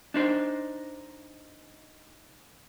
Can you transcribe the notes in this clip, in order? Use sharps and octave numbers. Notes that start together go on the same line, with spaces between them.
D4 D#4 C5